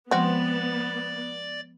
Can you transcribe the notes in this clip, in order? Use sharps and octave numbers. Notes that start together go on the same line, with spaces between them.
F3 G#3 B3 C4 F#4 C5 D5 A6